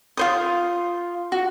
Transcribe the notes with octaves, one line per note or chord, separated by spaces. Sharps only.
F4 C5 D#6
F#4